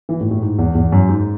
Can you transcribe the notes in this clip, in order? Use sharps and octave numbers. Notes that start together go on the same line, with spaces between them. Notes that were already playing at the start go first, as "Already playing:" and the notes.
E3
A2
A2
G#2
E2
E2
F#2
G#2